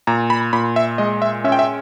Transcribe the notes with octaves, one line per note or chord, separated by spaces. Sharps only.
A#2 A#5
B5
A#2 B5
E5
G#3 D#5
E5
C#4 E5
G5
E5